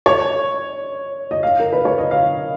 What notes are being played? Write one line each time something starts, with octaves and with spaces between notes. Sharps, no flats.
C#5
D#5
F5
A#4
B4
C#5
D#5
F5